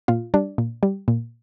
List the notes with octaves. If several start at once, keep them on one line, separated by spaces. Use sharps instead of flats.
A#2 F4
G3 D4
A#2
G3
A#2